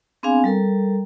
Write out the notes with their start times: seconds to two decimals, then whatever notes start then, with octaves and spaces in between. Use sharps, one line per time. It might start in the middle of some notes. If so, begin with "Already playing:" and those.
0.23 B3 C4 D4 G#4 F5 G#5
0.44 G3 A4 A#4 A#5